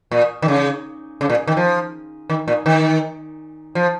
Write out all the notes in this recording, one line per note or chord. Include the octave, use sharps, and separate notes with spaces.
A#2
D#3
C#3
C#3
A#2
D#3
F3
D#3
A#2
D#3
F3